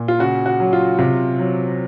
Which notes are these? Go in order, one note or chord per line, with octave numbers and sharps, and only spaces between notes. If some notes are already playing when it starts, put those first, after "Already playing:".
Already playing: A#2
F4
C#3 F#4
F#4
F#3
F4
C3 F4
F#3